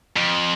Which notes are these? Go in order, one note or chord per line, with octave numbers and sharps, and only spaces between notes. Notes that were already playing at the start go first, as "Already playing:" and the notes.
F2